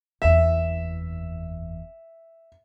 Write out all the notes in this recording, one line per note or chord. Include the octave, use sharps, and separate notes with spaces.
F#1 E2 E5